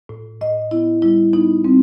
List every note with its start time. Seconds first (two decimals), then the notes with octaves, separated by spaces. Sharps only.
0.09 A2
0.41 A2 D#5
0.71 B3 E4
1.02 G3 E4
1.33 B3 D#4
1.64 G3 C4